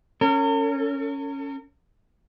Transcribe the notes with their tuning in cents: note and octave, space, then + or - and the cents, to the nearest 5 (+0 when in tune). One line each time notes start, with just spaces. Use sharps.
C#4 +0 A#4 -45